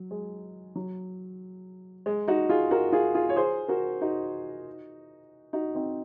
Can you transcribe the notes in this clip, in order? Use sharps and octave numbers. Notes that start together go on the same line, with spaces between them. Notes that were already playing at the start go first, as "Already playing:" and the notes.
Already playing: F#3
G#3
F#3
G#3
D#4 F#4
F4 G#4
F#4 A#4
F4 G#4
F4 G#4
C#5
G#4 C5
F#4 A#4
D#4 F#4
D#4 F#4
C4 D#4